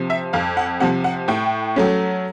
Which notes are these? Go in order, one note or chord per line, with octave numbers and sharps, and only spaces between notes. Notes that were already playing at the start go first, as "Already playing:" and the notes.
Already playing: C3 F3
E5
F2 F5
F#5
C3 F3 F#5
F#5
A2 G5
F#3 A3 C#4